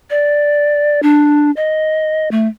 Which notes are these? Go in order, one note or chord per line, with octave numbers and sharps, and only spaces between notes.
D5
D4
D#5
A3